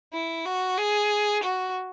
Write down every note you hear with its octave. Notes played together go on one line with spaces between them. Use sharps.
E4
F#4
G#4
F#4